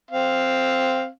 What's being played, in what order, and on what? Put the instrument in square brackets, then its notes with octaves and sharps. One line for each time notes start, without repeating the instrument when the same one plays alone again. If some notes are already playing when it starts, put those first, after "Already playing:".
[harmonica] C4 F5